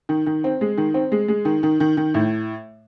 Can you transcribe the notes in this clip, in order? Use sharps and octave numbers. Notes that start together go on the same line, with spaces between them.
D#3
D#3
C4
G#3
D#3
C4
G#3
G#3
D#3
D#3
D#3
D#3
A2